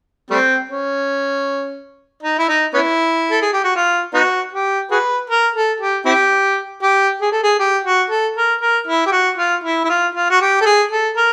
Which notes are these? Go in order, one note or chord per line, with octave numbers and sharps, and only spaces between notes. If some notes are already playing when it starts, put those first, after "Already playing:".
G3 A3 C4
C#4
D#4
E4
D#4
B3 C#4 E4
A4
G#4
G4
F#4
F4
B3 D#4 F#4
G4
F#4 G#4 B4
A#4
A4
G4
C4 E4 G4
G4
G#4
A4
G#4
G4
F#4
A4
A#4
A#4
E4
G4
F#4
F4
E4
E4
F4
F4
F#4
G4
A4
G#4
A4
A#4